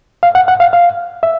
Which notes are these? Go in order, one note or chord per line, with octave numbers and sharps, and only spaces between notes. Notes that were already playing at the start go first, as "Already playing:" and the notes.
F5
F#5
F#5
F5
F5
E5